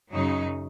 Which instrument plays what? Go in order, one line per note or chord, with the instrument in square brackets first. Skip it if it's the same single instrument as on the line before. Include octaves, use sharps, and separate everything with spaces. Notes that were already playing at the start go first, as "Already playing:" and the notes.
[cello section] F#2 C#3 F#3 D#4